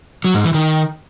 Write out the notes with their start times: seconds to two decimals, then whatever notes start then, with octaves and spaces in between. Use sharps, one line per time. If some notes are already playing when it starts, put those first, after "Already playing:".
0.24 F#3
0.34 G#2
0.44 E3
0.54 D#3